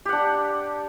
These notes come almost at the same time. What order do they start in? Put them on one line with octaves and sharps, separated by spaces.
G4 F#5 D4